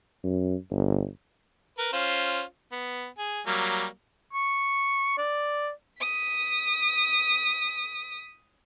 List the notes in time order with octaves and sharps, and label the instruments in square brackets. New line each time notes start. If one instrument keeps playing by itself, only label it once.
[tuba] F#2
G1
[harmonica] A#4 B4
C#4 F4 C5
B3
G#4
F#3 G3 A#3
[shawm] C#6
D5
[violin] D#6 B6